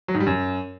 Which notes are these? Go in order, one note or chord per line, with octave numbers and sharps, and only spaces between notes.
F#3
G#2
G3
F#2